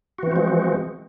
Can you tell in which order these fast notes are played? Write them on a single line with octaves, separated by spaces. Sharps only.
F#4 E3 C4 F3 G#3